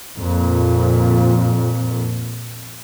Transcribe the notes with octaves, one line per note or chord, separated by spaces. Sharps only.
F2 A#2